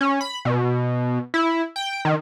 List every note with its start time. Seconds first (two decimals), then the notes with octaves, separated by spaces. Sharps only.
0.01 C#4
0.21 B5
0.45 B2
1.34 E4
1.76 G5
2.05 D#3